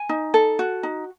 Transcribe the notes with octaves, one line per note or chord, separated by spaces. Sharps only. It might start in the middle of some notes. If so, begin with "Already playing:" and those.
Already playing: G#5
D#4
A4
F#4
D#4